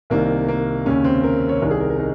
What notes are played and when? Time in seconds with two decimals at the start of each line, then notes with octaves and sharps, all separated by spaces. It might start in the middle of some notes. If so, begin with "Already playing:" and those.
0.10 C2 C3 D#3 A#3
0.48 A#3
0.86 D#2 C#3 C#4
1.04 C4
1.24 A#4
1.49 C#5
1.61 C2 C3 D#3 A#4
1.71 G#4
1.80 A#4
1.90 A#4
1.99 D#4